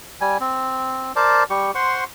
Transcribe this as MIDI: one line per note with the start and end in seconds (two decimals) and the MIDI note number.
0.21 0.38 55
0.21 0.38 80
0.40 1.12 60
1.16 1.44 70
1.16 1.44 72
1.16 1.44 74
1.16 1.44 81
1.50 1.71 55
1.50 1.71 67
1.50 1.71 85
1.75 2.04 72
1.75 2.04 78
1.75 2.04 84
1.75 2.04 85